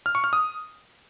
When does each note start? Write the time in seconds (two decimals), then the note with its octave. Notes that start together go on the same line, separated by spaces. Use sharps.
0.06 F6
0.15 C#6
0.24 F6
0.33 D#6